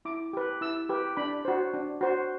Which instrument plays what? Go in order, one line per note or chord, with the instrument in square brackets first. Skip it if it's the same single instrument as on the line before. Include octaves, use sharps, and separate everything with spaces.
[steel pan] E4 D6
G4 B4
E4 E6
G4 B4
D4 B5
F#4 C5
D4
F#4 C5